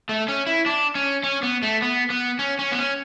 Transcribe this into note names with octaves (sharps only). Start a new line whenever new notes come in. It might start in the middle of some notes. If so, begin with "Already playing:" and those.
A3
C#4
E4
D4
C#4
C#4
B3
A3
B3
B3
C#4
C#4
B3
C#4